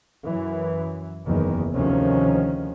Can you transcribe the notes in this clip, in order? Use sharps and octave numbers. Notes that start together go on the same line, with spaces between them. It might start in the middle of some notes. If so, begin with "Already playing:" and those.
F#2 E3
F#1 E2 D#3
D2 C3 D#3 F3 C#4